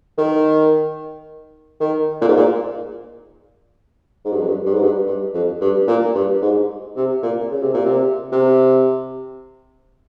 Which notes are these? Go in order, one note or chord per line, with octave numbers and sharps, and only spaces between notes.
D#3
D#3
A#2
G#2
A#2
G#2
G2
F2
G2
G2
G#2
G2
G2
F2
G2
A#2
G2
G#2
C3
A#2
C#3
C3
A#2
C3
C3